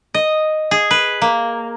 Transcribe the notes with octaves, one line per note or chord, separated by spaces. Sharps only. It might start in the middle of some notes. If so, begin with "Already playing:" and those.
D#5
G#4
B4
A#3